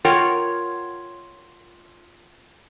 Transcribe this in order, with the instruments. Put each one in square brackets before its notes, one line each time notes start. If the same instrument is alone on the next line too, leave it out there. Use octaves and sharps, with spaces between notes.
[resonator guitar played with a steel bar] F4 A#4 C#5 F#5 G5